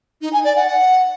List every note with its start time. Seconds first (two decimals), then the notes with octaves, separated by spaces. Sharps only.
0.21 D#4
0.33 G#5
0.44 D5
0.56 F#5
0.67 F#5